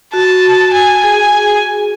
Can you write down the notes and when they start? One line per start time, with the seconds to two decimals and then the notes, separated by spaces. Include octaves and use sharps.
0.14 F#4 A5
0.73 G#5
1.04 G#4 G#5